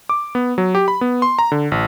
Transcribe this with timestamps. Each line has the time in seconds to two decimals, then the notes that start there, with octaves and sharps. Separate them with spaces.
0.09 D6
0.35 B3
0.58 F#3
0.75 G4
0.88 B5
1.01 B3
1.22 C6
1.39 A#5
1.52 D3
1.72 A1